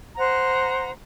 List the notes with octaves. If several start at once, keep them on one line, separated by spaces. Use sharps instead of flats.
C5 F#5 A#5